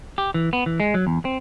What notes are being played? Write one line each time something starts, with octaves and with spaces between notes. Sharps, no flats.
G4
E3
B3
E3
G#3
F#3
E2
C4